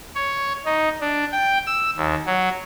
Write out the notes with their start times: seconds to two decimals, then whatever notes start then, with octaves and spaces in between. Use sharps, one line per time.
0.15 C#5
0.65 D#4
1.01 D4
1.32 G5
1.67 E6
1.97 D#2
2.26 F#3